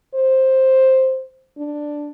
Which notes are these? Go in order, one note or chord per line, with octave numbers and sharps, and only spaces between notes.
C5
D4